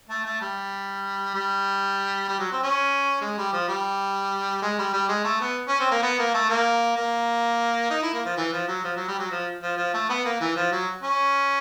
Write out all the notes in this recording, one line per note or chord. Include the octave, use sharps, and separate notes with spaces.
A3
A3
G3
G3
G3
F#3
C4
C#4
G#3
G3
F3
G3
G#3
G3
G3
G#3
A3
B3
C#4
C4
A#3
B3
A#3
A3
A#3
A#3
D#4
E4
A#3
F3
E3
F3
F#3
F3
F#3
G3
F#3
F3
F3
F3
A3
B3
A#3
E3
F3
F#3
C#4